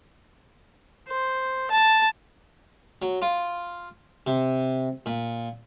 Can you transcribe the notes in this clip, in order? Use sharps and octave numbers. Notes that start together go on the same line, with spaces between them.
C5
A5
F#3
F4
C3
A#2